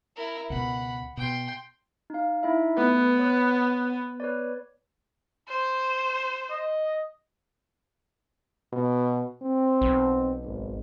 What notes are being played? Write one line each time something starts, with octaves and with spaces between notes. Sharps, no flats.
E4 A#4
C#2 B2 F#5 B5
B2 G5 C6
D#4 F5
D#4 E4 E5
A3 B3 B4
C#5 D#6 F#6
B4 C#5 D5
C5
D#5
B2
C4
B1
G#1